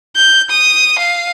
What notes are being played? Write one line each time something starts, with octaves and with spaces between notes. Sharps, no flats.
G6
D#6
F5